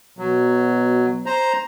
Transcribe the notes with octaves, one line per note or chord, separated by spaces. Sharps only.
B2 F#3
C5 A#5